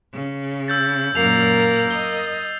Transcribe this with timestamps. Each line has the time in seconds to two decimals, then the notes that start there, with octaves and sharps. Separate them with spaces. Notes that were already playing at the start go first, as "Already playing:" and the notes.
0.14 C#3
0.68 E6 G6 A6
1.15 F#2 A#2 A#3 A#4 C7 F7
1.90 D#5 G7